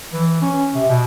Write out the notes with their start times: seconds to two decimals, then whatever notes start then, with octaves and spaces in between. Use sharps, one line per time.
0.13 E3
0.42 C#4
0.75 C3
0.89 B2